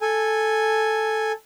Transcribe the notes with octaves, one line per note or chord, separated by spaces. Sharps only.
A4 G#5